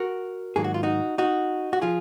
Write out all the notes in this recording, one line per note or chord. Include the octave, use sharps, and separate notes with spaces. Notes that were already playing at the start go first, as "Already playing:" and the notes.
Already playing: F#4 A#4
G#2 D#3 F#3 A#3 G#4
F#4
F4
D#4 F#4
D#4 F#4
F#4
F3 F4 G#4